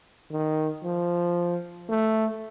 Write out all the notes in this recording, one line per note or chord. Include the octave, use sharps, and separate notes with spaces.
D#3
F3
A3